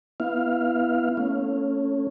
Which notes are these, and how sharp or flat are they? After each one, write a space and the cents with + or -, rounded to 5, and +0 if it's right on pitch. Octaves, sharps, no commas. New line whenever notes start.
B3 -5 E4 +0 F5 +0
A3 +25 C#4 +0